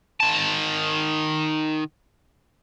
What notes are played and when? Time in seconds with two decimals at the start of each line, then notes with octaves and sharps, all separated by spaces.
0.20 D#3 A5